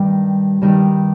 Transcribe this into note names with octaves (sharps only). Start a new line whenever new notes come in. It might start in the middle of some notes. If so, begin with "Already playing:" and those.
Already playing: G2 D#3 G3
G2 D#3 G3